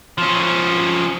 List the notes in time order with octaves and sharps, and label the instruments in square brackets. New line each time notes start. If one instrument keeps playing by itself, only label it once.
[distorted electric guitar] F3 C#4